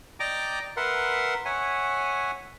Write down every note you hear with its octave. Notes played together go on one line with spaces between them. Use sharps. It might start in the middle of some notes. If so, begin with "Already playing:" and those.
D5 D#5 G5 A#5 D6
A#4 B4 E5 F#5 C6
C#5 E5 F#5 G#5